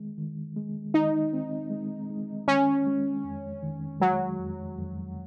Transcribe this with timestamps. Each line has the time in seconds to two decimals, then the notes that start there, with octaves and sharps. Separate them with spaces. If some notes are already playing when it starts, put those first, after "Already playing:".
Already playing: D#3 G#3
0.18 D#3
0.56 G#3
0.94 D#3 D#4
1.33 C4
1.71 G#3
2.10 G#3
2.48 D#3 C#4
2.87 G#3
3.24 F2
3.62 D#3
4.00 F#3 G#3
4.39 F2
4.78 F2